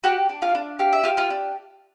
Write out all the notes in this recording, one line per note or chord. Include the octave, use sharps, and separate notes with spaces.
F#4 G4 F#5
D4
F4 F5
D4
G4 F5
E5
F4 G4 F5
F4 F5
D4